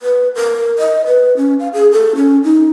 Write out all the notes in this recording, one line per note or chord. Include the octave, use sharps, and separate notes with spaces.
B4
A#4
D#5
B4
C#4
F5
G#4
A4
C#4
D#4